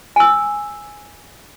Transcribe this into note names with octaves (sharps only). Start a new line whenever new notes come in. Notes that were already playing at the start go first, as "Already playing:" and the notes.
G#5 E6